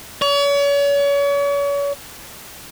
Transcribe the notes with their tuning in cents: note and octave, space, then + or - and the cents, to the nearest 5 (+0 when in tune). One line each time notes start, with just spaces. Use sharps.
C#5 +40